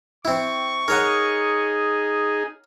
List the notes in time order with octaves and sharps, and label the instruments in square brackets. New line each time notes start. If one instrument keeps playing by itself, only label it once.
[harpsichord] C4 E4 [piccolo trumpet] C#6
[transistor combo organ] D#4 G#4 [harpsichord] A#4 C#5 F#5